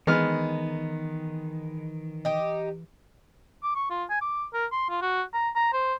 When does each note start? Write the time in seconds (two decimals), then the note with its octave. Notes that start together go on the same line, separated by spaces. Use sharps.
0.07 D#3 E3 G#3 B3 F6
2.25 D#4 G4
3.63 D6
3.75 C#6
3.90 F4
4.10 G#5
4.21 D6
4.54 A#4
4.72 C6
4.90 F4
5.02 F#4
5.34 A#5
5.55 A#5
5.73 C5